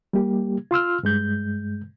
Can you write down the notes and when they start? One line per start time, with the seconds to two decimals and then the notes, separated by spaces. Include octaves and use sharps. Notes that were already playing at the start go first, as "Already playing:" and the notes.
0.13 G3 A#3 G4
0.71 F4 C6 E6 F6
1.03 G2 G#3 G6